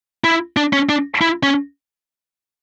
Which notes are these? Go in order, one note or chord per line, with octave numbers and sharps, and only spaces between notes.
E4
D4
C#4
D4
E4
C#4